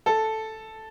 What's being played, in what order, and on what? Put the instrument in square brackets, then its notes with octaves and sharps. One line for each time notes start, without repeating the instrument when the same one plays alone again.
[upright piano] A4